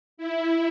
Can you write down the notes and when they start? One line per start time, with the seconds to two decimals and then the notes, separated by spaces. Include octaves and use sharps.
0.17 E4